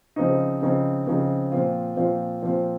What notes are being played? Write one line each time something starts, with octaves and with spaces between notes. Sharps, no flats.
C#3 F3 C4 D#4
C#3 F3 C4 D#4
C#3 F3 C4 D#4
A#2 F3 C4 F4
A#2 F3 C4 F4
A#2 F3 C4 F4